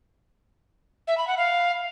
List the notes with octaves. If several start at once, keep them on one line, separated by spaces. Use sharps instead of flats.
E5
B5
F#5
F5